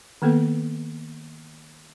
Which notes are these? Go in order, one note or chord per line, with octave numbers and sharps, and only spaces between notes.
D#3 A#3 B3 A4 B4